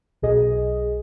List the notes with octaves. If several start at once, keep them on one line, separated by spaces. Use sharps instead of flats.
B1 B2 G#4 D#5